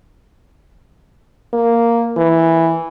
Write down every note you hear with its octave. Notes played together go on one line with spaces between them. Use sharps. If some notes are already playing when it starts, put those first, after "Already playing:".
A#3
E3